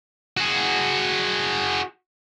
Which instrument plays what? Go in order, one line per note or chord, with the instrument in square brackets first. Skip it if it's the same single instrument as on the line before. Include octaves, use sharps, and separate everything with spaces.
[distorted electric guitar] F#4 G#4